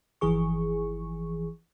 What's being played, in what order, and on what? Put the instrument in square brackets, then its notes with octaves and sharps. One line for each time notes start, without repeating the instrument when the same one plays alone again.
[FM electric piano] G1 E3 F3 G#4 C#6